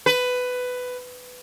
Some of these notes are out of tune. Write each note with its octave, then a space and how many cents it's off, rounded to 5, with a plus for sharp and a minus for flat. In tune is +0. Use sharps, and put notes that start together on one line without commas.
B4 +15